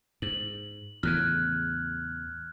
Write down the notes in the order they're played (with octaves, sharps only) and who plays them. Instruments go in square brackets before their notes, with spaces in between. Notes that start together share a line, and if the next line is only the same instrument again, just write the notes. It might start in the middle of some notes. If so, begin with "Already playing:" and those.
[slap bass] G#2 [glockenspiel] F#7
[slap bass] E2 A2 C#3 [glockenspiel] F6 F#6 G#6